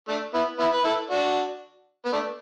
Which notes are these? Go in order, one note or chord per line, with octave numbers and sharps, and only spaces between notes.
A3 D4
B3 E4
B3 E4
B4
E4 A4
D4 F#4
B3
A3 D4